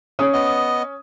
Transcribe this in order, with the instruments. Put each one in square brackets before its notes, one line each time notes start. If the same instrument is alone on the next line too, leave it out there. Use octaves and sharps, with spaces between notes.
[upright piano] C#4 D#6
[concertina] B3 D#5